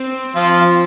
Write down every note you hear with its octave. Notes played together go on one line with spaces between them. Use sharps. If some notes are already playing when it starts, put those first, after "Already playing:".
Already playing: C4
F3 F4